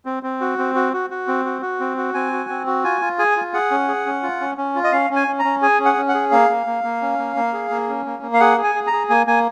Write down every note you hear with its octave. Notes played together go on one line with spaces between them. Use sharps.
C4
C4
F#4
C4
F#4
F#4
F#4
C4
F#4
F#4
C4
F#4
C4 G#5
F#4
C4
F#4
F4 G#5
F4
G#4 G#5
F4
G#4 F#5
C#4
G#4
C#4
F4
C#4
C#4
F4
D#5
C#4 F5
C#4
G#5
C#4
A#5
C#4
G#4 G#5
C#4
F#5
C#4
F#5
G#4
A#3 F5
A#3
A#3
A#3
C#4
A#3
A#3
G#4
A#3
C#4
A#3
A#3
F5
G#4 F#5
G#4
G#5
G#4
A#5
G#4
A#3 G#5
A#3 G#5